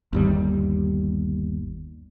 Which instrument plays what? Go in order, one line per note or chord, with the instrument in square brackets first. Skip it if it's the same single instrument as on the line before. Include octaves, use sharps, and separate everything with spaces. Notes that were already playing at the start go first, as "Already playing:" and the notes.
[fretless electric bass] G1 D#2 G3